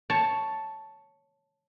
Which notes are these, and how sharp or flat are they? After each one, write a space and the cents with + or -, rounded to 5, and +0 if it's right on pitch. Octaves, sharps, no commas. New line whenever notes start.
C#5 +0 A5 +0